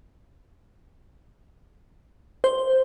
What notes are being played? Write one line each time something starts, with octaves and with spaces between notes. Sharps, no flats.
C5